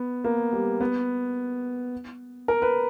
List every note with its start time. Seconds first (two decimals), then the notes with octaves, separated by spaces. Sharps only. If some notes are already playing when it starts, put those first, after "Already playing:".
Already playing: B3
0.24 A#3
0.53 G3
0.81 B3
2.48 A#4
2.62 B4